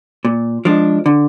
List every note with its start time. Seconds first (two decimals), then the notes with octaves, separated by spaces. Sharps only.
0.25 A#2
0.65 F3 G#3 D4
1.06 D3